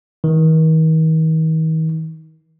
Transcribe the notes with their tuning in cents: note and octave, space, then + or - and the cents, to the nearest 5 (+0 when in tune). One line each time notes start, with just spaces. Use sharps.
D#3 +40